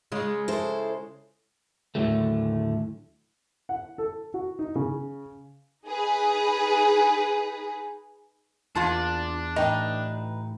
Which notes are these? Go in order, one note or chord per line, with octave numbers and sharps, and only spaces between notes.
C#3 G#3 F4
E4 A4 C5
D#2 A2 D3 F#3 A3
F#5
A4
F#4
D#4
C#3
D#4 G#4 B4
E2 A#3 D4 F4 A5
A2 E3 D#4 B4 D#5 G5